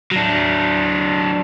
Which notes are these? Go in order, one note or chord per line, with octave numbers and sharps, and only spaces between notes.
F#3 D4